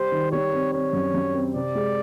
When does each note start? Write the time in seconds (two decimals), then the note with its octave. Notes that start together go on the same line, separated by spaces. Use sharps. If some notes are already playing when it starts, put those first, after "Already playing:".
Already playing: G3 C5
0.12 D#3
0.32 G3 C#5
0.52 C4
0.73 C4 C#5
0.93 F#2
1.14 F#2
1.34 C4
1.55 C3 D5
1.75 G#3